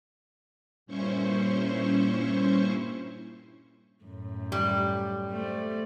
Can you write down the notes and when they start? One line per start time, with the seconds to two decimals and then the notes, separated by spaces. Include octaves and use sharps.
0.86 G2 A#2 C#4 E4 C5 C#6
4.04 F#2 A2
4.52 G3
5.31 A3 C5 D5